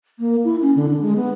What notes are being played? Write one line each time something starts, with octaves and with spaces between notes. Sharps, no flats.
A#3
E4
C#4
D3
D4
G#3
B3